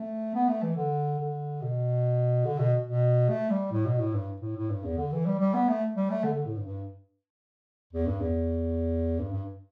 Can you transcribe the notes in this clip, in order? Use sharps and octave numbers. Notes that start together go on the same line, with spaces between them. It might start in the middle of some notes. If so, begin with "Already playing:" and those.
Already playing: A3
B3
A3
E3
D3
D3
B2
D3
B2
B2
A3
G3
A2
B2
A2
G2
A2
A2
G2
E2
D3
E3
G3
G3
B3
A3
G3
A3
D3
D3
A2
G2
G2
E2
G2
E2
G2
G2